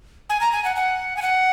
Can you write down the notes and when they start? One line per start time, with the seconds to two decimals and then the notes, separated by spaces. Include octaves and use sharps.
0.30 G#5
0.41 A#5
0.52 G#5
0.64 F#5
0.76 F#5
1.17 G#5
1.22 F#5